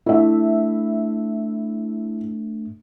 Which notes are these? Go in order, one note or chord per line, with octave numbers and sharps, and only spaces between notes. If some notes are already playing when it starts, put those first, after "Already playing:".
A3 D4 E4 E5